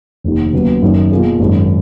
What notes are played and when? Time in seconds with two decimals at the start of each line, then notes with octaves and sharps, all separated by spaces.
0.24 F1 D#2 D#3
0.53 D#2 C#3 F#3 B3
0.82 F#1 F#2 D#3
1.12 B2 A#3 F4 G#4
1.40 G#1 F#2 D#3 G#3